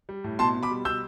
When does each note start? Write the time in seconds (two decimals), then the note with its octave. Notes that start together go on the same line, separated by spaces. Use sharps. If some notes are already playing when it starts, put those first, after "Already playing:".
0.09 G3
0.24 A2
0.39 B2 A5 C6
0.54 B2
0.63 B5 D6
0.71 G3
0.85 B2 E6 G6